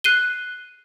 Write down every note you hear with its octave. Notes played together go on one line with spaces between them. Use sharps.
F#6 C7 D#7 G7